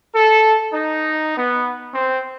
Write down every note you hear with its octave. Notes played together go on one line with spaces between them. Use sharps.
A4
D#4
B3
C4